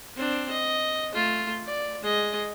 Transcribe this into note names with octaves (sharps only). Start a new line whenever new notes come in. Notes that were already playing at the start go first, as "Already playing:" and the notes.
C4 D4
D#5
A3 F4
D5
G#3 D#5